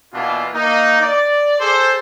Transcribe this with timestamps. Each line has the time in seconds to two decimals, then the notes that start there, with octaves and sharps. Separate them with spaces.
0.14 B2 E3 A#3 D4 F4
0.54 A#3 D#4
1.00 D5
1.59 G#4 A4 C5